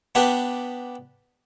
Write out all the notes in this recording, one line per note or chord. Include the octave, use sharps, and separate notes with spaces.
B3 D4 G4 B4